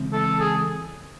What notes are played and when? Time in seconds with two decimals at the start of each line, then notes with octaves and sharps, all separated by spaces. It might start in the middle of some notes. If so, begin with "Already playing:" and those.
Already playing: C#3 E3 G#3 C4
0.13 A4
0.40 G#4